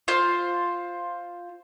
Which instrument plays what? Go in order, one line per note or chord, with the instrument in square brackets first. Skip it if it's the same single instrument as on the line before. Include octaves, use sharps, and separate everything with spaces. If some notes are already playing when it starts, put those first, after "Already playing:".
[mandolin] F4 C5